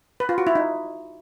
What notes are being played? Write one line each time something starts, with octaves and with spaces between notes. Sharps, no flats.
B4
F4
F#4
E4
D#4